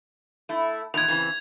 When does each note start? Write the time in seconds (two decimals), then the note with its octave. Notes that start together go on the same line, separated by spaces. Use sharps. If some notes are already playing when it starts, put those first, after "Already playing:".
0.49 A3 E4
0.94 E2 A#2 D#3 G#6 F7
1.08 C#3 E3 C4